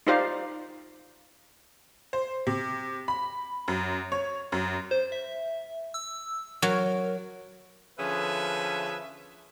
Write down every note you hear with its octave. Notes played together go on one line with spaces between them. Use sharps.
D#4 F4 G4 C5 D5 F5
C5
C3
B5
F#2
C#5
F#2
C5
E5
E6
F#3 A#4
D3 F3 C#4 G#4 B4 E5